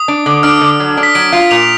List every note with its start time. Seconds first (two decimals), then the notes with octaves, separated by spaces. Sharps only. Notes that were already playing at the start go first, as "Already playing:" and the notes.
Already playing: D#6
0.08 D4
0.26 D3
0.43 D4 F6
0.61 D3
0.80 F#3
0.97 D4
1.03 B6
1.15 F#3 D7
1.32 F4
1.51 A#2 F7